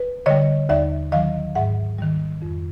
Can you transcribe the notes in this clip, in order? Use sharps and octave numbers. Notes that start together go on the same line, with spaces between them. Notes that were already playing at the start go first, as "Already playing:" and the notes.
Already playing: B4
D3 G3 C#5 D#5
D#2 D5 E5
D#3 F#3 D#5 F5
G#2 E5 F#5
D#3 G3
F2